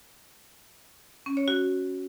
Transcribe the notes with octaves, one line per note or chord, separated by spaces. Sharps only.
C#4
C#5
F#4